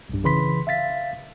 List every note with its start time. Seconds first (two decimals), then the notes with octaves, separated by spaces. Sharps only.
0.09 B1 G2
0.24 C#3 E3 B4 B5 C6 B6
0.67 E5 F5 A6 B6